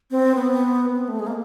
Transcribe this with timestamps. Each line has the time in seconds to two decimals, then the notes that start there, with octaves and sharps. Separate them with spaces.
0.11 C4
0.35 B3
0.95 C4
1.08 A3
1.19 G#3
1.27 A#3